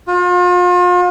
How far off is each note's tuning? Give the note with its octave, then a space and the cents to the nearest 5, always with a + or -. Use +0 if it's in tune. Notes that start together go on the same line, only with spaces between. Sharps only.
F4 +40